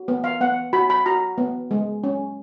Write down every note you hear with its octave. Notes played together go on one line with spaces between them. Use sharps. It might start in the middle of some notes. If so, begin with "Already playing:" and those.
Already playing: F#4
B3
F5
B3 F#5
F#4 B5
B5
F#4 A#5
B3
G#3
C#4